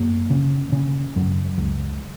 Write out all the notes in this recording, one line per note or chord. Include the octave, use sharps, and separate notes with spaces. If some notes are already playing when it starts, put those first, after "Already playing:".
Already playing: F#2 A#3
C#3
C#3
F#2
C#2